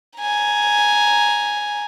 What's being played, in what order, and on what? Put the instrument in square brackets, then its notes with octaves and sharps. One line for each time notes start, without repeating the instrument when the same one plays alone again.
[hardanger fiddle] G#5 A#5